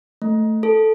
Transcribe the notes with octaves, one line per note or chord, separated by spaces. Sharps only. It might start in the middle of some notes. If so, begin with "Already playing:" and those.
A3
A4